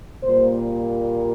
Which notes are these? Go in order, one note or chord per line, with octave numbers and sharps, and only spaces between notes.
A#2 G3 A#3 C5